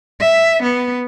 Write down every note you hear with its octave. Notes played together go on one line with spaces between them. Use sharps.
E5
B3